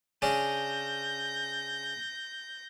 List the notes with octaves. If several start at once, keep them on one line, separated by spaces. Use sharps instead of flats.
C#3 C#4 D4 G6 A#6